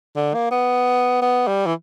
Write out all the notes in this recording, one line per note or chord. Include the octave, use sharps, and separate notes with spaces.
D3
A#3
B3
B3
G3
E3